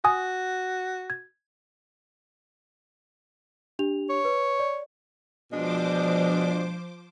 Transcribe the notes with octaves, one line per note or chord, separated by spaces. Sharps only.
F#4 G#5 D#6
G#6
D4 G4 F7
C#5
B4
D5
B2 F3 G#3 D4 C5 D6